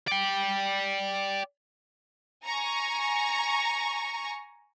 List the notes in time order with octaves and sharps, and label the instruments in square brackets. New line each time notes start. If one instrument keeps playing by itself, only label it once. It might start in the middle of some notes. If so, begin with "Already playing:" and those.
[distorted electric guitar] D5 G5
[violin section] G#5 A#5 C#6